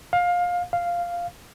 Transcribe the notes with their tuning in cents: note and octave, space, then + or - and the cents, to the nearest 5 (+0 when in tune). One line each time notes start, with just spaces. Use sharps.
F5 +20
F5 -5